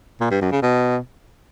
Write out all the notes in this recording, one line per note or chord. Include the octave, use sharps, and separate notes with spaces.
A#2
G2
F#2
C#3
B2